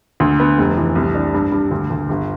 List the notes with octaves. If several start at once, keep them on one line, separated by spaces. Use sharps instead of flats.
D2
B3
F1
E3
C2
D4
G2
G2
D2
D2
G1